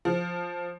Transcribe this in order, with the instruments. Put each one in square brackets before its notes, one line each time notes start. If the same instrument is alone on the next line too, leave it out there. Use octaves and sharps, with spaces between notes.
[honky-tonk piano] F3